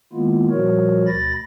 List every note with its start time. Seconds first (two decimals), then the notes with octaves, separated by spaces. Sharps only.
0.13 D#3 G#3 A#3 B3 E4 F4
0.50 A#2 F3 G3 F#4 A#4 C#5
1.07 D2 B2 B5 A6 A#6